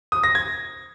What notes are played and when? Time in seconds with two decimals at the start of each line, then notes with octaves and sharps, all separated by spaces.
0.12 D#6
0.23 A#6
0.35 G#6